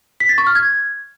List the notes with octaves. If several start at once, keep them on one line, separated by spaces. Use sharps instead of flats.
B6
A6
C#6
F6
G#6